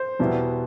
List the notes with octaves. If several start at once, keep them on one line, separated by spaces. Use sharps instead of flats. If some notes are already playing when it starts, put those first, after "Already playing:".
Already playing: C5
E2 B2 G3 B3 E4